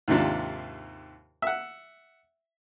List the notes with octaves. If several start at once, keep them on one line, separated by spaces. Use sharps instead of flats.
D#2 G#2 C3 D4 F4
E5 F#5